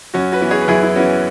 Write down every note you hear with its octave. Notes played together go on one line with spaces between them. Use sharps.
F#2 C#4 F#4
F#4 B4
E3 B3
G#4 C#5
B4
F#2 E4 G#4
E4
E3 B3 C#4 F#4